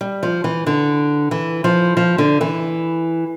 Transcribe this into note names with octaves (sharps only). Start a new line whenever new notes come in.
G3
F3
E3
D3
E3
F3
F3
D3
E3